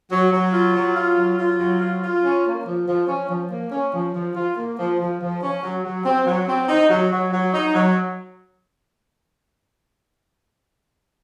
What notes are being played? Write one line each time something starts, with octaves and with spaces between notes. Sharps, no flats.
F#3
F#3
F4
F#3
F4
F#3
F4
F#3
F4
F4
C#4
A#3
F3
F3
C#4
F3
A#3
C#4
F3
F3
F4
A#3
F3
F3
F3
C#4
F#3
F#3
C4
F#3
C4
D#4
F#3
F#3
F#3
D#4
F#3